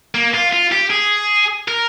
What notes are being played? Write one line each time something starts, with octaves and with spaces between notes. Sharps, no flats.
A#3
F4
F4
G4
G#4
A#4